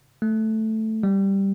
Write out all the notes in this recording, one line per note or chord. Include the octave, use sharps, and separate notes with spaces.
A3
G3